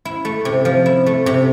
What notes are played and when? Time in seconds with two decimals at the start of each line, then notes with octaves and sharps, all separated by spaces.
0.05 E4
0.25 A3
0.45 C3
0.65 F3
0.86 E4
1.06 A3
1.26 C3